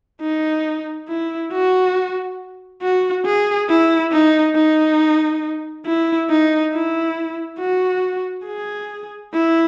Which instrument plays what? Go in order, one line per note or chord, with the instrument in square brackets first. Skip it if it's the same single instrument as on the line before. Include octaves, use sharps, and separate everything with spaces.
[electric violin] D#4
E4
F#4
F#4
G#4
E4
D#4
D#4
E4
D#4
E4
F#4
G#4
E4